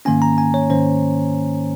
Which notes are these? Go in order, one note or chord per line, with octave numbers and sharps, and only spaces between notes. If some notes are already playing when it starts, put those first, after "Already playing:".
G#2 D#3 A#3 C#4 G#5
A#5
G#5
C#5
G#2 D#3 A#3 C#4 C5